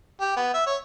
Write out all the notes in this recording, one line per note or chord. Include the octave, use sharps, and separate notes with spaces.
G4
B3
E5
C#5